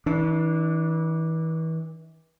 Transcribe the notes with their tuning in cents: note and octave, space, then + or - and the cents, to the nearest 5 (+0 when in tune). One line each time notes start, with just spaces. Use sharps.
E3 -35 D4 +0